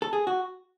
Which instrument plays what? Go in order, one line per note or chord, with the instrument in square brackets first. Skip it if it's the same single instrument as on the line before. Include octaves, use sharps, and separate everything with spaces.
[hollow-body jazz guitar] A4
G#4
F#4